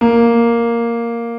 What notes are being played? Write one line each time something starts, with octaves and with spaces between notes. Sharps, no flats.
A#3